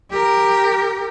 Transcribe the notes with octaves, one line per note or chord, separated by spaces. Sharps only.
G4 A#4